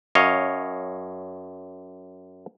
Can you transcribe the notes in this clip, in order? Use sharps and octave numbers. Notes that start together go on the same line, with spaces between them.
F#2 C#5 D#5 F5